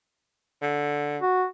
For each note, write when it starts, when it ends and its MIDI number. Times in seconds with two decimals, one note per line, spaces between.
0.62 1.19 50
1.22 1.45 66